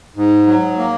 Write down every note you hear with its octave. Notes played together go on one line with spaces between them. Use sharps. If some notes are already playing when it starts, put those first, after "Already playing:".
G#2
F#3
A#3